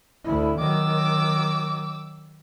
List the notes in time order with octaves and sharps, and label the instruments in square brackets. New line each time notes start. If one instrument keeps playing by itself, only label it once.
[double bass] D2 E4
[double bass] D#3 F#3 [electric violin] D6 E6